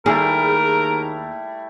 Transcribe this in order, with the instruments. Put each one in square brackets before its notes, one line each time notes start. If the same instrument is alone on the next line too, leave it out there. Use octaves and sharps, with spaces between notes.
[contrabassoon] D#2 [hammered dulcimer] G3 A3 E4 [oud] G#4 [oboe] A#4